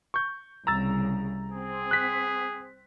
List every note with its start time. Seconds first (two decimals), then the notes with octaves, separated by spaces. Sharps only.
0.14 C#6 G6
0.67 C2 C#3 A#5 E6 A6
1.51 C4 G#4
1.91 F#6 B6